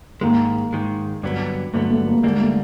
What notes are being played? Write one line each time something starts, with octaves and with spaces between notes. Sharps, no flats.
G#2 D#3 G#3 A#3
G#2 D#3 G#3
G2 D3 F#3 B3
G2 D3 F#3 A3 B3
A3
A#3
D2 D3 G3 G#3 A#3
A3